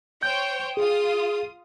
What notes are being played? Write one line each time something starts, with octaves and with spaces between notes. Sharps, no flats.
C5 C#5 G5 G6
F4 G#4 D#6